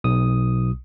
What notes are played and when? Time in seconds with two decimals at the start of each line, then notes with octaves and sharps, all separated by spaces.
0.04 B1 D#6